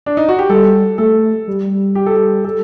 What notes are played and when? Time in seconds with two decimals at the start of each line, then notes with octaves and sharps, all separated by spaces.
0.06 D4
0.17 D#4
0.29 F#4
0.39 G4
0.49 G3 A4
0.98 A3 A4
1.48 G3
1.95 G4
2.06 A4
2.16 G4
2.45 A4